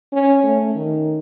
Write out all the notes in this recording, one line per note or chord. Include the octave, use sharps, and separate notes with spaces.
C#4
A3
D#3